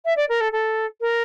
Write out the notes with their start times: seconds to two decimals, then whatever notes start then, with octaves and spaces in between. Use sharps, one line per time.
0.05 E5
0.17 D5
0.29 A#4
0.40 A4
0.52 A4
1.01 A#4